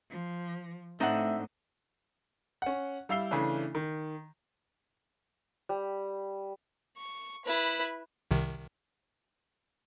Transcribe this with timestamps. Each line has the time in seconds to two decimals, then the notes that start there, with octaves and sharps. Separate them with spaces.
0.10 F3
1.00 A2 A3 C4 D4 D#4 E5 F#5
2.62 C#4 F#5
3.09 G3 E4 F5 E6 C7 G7
3.31 C#3 E3 A3 C#4 D4
3.75 D#3
5.69 G3
6.98 C#6
7.45 E4 B4
8.31 C2 C3 D#3